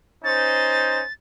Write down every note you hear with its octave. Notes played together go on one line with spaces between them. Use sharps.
C#4 D#4 C5 A6